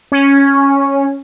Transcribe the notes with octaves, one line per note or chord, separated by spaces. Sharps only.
C#4